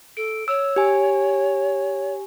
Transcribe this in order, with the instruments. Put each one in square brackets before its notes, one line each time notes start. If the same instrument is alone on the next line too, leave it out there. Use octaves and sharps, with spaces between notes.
[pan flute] A4 [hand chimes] D7
[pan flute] C#5 [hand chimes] E6
[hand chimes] G4 G#5